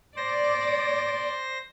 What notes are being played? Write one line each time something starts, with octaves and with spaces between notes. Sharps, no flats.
C5 D5 A#6